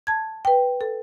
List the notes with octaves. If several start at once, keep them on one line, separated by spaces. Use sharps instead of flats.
A5 G#6
B4 G5
A4